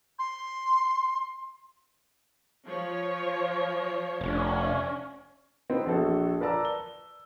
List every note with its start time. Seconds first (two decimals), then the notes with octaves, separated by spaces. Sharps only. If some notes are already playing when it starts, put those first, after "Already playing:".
0.19 C6
2.66 F3 C#5
4.21 F1 C#4 D4
5.70 B3 C4 D#4
5.86 A#1 F#4 A4
6.40 A#4 B4 D5 A5 A#5 E6
6.65 G7